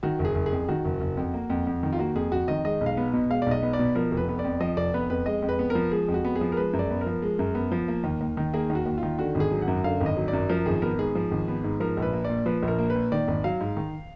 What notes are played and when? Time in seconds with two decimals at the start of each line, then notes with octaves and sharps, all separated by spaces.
0.03 D#3 F#4
0.19 F#1
0.25 G#4
0.35 F#1
0.46 G#4
0.52 F2
0.68 D#3 F#4
0.85 F#1
1.01 F#1
1.17 F2
1.34 A#3
1.50 F2
1.67 F2
1.83 D#3
1.93 F4
1.99 A#3 F#4
2.15 F2 G#4
2.32 F2 F#4
2.48 D#3 D#5
2.65 G#3 D#5
2.81 B1
2.86 F5
2.97 B3
3.13 B2
3.29 G#3 F5
3.42 B1 D5
3.51 D#5
3.63 B3
3.73 D5
3.79 B2
3.95 F3 A#4
4.12 F1
4.17 B4
4.29 B3
4.39 D5
4.44 F2
4.60 F3 D#5
4.77 F1 D5
4.94 B3 B4
5.10 F2 B4
5.26 G#3 D#5
5.42 F2
5.49 B4
5.59 B3
5.70 A#4
5.75 F3
5.91 G#3 G#4
6.08 F2
6.14 F#4
6.25 B3
6.36 G#4
6.41 F3
6.52 A#4
6.57 G#3 B4
6.73 F#2
6.79 D5
6.90 B3
7.01 A#4
7.06 F3
7.22 G#3
7.39 F#2
7.55 B3
7.72 F3
7.88 A#3
8.04 D#2
8.21 D#2
8.37 D#3
8.53 A#3 G#4
8.70 D#2
8.75 F#4
8.86 D#2
8.98 F4
9.03 D#3
9.19 D3 F#4
9.35 G#1
9.40 G#4
9.51 F#3
9.62 F#5
9.67 F#2
9.84 D3 F5
10.01 G#1
10.06 D#5
10.17 F#3
10.28 D5
10.33 F#2
10.49 F3 A#4
10.66 G#1 G#4
10.82 B3 A#4
10.99 G#2 G#4
11.15 F3
11.31 G#1
11.48 B3
11.64 G#2
11.80 F3 A#4
11.97 A#1
12.02 B4
12.13 A#3
12.25 D5
12.30 A#2
12.46 F3 B4
12.63 A#1
12.68 A#4
12.79 A#3
12.90 B4
12.95 A#2
13.12 D#3 D5
13.28 G#1
13.44 F#3 F5
13.60 G#2
13.77 D#3